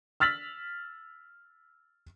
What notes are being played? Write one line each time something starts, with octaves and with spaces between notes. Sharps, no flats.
E6 F6 A6 B6 F#7